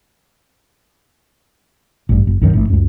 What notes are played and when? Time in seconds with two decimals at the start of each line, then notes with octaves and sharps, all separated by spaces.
2.09 A1 G2
2.27 F#1
2.41 C2 G2 D#3 F#3
2.53 A1 G#2 A3
2.70 C#2 F#2